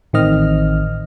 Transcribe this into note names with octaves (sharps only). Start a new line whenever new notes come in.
A1 D#3 C4 D#5 F6